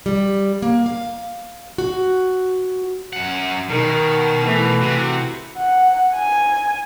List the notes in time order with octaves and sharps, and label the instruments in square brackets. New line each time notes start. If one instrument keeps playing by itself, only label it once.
[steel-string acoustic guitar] G3
A#3
F5
F#4
[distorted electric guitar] F#2 F#5
[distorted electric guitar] B2 [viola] D#3
[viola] E3 A3
[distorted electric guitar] C3 [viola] E3 F#4
[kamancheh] F#5
G#5